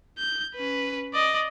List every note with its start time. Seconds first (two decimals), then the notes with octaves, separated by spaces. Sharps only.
0.19 G6
0.56 C#4 B4
1.14 D5 D#5